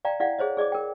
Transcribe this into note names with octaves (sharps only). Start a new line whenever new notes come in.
D5 F5 G5 A#5
E4 D5 F5 F#5
G#4 C5 C#5 D#5
G#4 D5 D#5 D6
A#4 G5